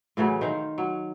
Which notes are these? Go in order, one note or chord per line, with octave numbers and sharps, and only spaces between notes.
A2 C#3 E3 F#3
D#3 C5 F5 G5
F#3